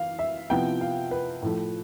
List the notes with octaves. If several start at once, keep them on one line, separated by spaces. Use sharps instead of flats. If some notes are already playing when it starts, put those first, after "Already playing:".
Already playing: E3 F5
E5
C3 F3 B3 E4 G5
F5
B4
A2 F3 A3